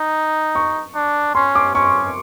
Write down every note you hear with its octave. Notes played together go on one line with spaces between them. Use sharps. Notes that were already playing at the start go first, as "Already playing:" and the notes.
Already playing: D#4
C#6
D4
C#4 C6
D6
C#4 C#6